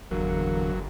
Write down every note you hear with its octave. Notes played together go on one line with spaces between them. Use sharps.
G1 E2 D3 F#3 A#3